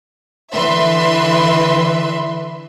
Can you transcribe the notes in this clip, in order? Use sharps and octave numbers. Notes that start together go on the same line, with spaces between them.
D3 E3 B4 E5 C6